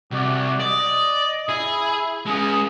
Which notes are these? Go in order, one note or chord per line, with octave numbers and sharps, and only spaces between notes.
C2 F#4 D5
D5 D#5
E4 G#4
G#3 C#4 G#4 D#6